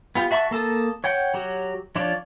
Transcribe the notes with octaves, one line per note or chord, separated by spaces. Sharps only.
B3 F4 G4
F#4 E5 A5 C6 C#6
A#3 A4 A5 D#6
C#5 F#5 G5
F#3 F#4 G4
F3 D4 F4 C#5 D5